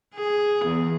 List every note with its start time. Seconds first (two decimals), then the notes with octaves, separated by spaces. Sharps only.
0.14 G#4
0.65 E2